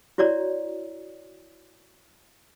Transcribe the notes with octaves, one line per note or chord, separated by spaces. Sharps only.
E4 F#4 C#5 D5 A#5